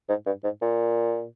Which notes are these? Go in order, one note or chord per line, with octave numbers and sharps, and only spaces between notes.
G#2
G2
G#2
A#2